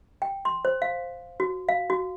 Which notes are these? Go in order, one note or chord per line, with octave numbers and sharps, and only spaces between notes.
G5
C6
C5
F5
F#4
F5
F#4